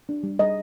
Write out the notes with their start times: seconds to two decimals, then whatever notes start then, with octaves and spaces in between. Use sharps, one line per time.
0.09 D4
0.23 G3
0.39 G3 D#5